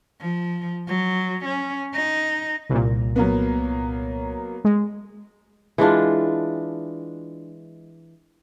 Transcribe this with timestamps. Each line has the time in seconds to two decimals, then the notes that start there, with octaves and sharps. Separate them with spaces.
0.21 F3
0.87 F#3
1.45 C#4
1.94 D#4
2.70 C2 A#2
3.16 F#3 A#3 B3
4.65 G#3
5.78 E3 G#3 D4 F4